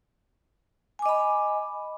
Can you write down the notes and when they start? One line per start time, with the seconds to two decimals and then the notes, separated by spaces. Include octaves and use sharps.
0.99 G#5
1.02 D6
1.06 D#5
1.09 B5